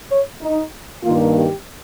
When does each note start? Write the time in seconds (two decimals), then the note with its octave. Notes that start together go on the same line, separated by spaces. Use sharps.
0.12 C#5
0.42 D#4
1.04 G2 D#3 A#3 F4
1.35 G4